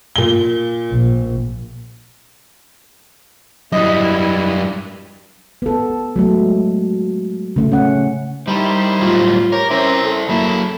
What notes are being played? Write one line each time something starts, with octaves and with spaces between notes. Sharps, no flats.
A#2 G7
A#1
F#2 G3 E4 D#5
B3 A4
F#3 G#3 A3
C#3 A3
C#4 F#5
D#3 G3 E4 C5
A2 F#3 G3 F4
G4 A#4 C#5
C4 C#4 E4 A#4 C5 E5
A4
F#3 A#3 E4